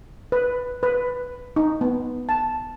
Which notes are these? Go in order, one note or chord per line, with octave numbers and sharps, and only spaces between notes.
B4
B4
D#4
B3
A5